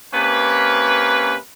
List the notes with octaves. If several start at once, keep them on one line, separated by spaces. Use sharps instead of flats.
C3 A#3 C#4 B4